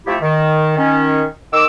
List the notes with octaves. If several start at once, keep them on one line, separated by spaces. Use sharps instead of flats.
C3 F3 A3 E4 G4
D#3
D#3 C#4
D#3 D6 E6